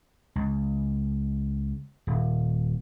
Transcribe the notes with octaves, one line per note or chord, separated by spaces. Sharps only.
C#2
D#1